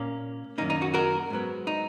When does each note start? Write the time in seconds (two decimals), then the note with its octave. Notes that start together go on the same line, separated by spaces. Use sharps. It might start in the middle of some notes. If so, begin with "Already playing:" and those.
Already playing: A#2 A#3 C#4
0.58 F#2 D#3 A#3 C#4 D#4
0.70 D#4
0.81 D#4 F#4
0.94 F#4 A#4
1.30 G#2 F#3 B3
1.67 D#4